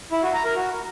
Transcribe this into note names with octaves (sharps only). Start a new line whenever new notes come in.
E4
F#4
A#5
A#4
F#4